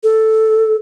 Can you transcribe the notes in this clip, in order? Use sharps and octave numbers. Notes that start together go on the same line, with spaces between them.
A4